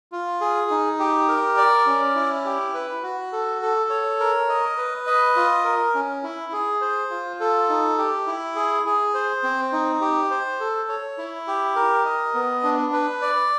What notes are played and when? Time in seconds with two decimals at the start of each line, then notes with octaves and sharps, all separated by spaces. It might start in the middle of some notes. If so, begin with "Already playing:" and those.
0.12 F4
0.41 G#4
0.70 D#4
0.99 G4
1.29 A#4
1.57 D5
1.86 C#4
2.15 E4
2.45 G4
2.74 B4
3.03 F#4
3.32 A4
3.62 A4
3.90 C#5
4.20 A#4
4.49 D#5
4.78 B4
5.07 D#5
5.36 F4
5.65 A#4
5.95 C#4
6.23 E4
6.52 G#4
6.81 C5
7.11 F4
7.40 A4
7.69 D#4
7.98 G4
8.27 E4
8.55 G#4
8.85 G#4
9.14 C5
9.44 C4
9.72 D#4
10.01 G4
10.30 C5
10.60 A4
10.89 C#5
11.18 E4
11.47 G4
11.76 A#4
12.05 D#5
12.34 B3
12.63 D4
12.93 B4
13.22 D5